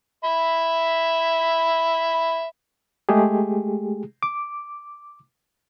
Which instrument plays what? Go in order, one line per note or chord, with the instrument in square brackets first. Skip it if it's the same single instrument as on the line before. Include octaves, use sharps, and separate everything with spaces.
[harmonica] E5 B5
[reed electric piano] G#3 A3 G4 G#4
D6